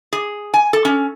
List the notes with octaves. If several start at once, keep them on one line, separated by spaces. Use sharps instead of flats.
G#4
G#5
A4
C#4